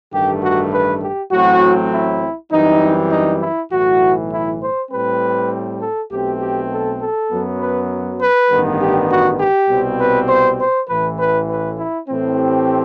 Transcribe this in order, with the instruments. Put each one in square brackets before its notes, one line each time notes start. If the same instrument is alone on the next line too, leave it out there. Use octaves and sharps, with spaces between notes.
[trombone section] A1 G2 D#3 A3 G4
F#4
B4
G4
A1 A2 F#3 C4 F#4
E4
F#2 E3 G3 C4 D#4
D#4
E4
B1 A2 E3 F#4
E4
C5
A2 G3 C4 B4
A4
B1 B2 A3 C4 G4
G4
A4
A4
F#2 F#3 B3
B4
B4
A1 G2 D#3 G3 B3
G4
F#4
G4
C2 B2 G3 C4
B4
C5
C5
A1 A2 E3 B4
B4
B4
E4
A2 E3 A3 C4
G4